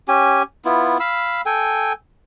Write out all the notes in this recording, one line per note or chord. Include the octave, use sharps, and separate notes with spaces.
C#4 G4 G#5
B3 E4 F4
F5 B5 E6
A4 G5 G#5